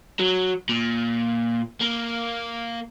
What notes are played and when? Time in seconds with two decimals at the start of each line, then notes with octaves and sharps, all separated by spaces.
0.20 F#3
0.69 A#2
1.81 A#3